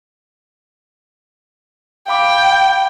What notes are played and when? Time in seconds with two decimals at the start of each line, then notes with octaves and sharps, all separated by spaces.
2.08 F5 G5 B5 D6